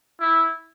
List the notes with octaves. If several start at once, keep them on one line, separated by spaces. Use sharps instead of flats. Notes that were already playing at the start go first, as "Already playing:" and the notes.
E4